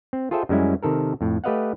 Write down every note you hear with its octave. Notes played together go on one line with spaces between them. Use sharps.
C4
F4 G#4 A4 C5 E5 G5
F#2 G3 G#3 C#4 E4
C3 D#3 A4 A#4
F2 A2
A3 G4 B4 D#5 F5 F#5